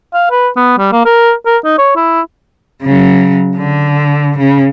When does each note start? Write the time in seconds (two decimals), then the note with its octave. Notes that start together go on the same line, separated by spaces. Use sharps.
0.14 F5
0.31 B4
0.56 B3
0.78 G3
0.92 A#3
1.05 A#4
1.46 A#4
1.64 D#4
1.78 C#5
1.96 E4
2.83 C#3 F#3
3.57 D3
4.38 C#3